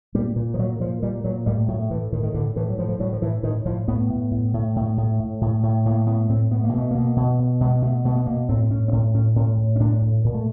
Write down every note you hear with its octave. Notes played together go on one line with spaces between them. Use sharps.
A#2 G3
A#2
F3
A#2 F#3
A#2 F3
A#2 G3
A#2 F#3
A2 G3
A2 F#3
A2 E3
A2 D#3
D#3
A2 D3
A2 E3
F#3
A2 F3
F3
A2 F#3
F3
A2 E3
A2 D#3
A2 F3
A2 B3
A2
A2
A2
A2
A2
A2
A2
A2
A2 A#3
A2 B3
A2 C4
A2 B3
A#3
B2 A3
B2 A#3
B2
B2
B2 G#3
B2 A3
B2 A3
B3
B2 A#3
A2 C4
A2 C#4
C4
A2 C#4
A2 C#4
A2 C#4
A2
C#4
A2 D4
A2
A#2
A3